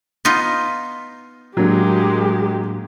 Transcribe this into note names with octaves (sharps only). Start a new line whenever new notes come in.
B3 D#4 F4
A2 F#3 G#3 A#3 D4 G4